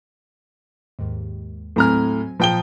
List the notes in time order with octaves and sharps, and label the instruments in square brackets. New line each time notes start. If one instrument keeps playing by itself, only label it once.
[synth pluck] D#2 G#2
[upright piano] A2 A#5 F6 [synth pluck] F#3 C4 G#5
[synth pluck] A#2 A#5 D#6 [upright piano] F3 G5 G7